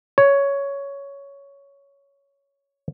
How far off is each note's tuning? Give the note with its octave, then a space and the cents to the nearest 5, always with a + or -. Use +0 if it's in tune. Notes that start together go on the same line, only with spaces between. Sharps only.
C#5 +10